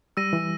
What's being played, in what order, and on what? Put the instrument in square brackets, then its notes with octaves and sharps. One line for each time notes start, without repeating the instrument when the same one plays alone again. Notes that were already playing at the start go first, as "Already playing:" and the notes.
[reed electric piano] G3 [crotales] E6 A#6 D#7
[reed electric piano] E3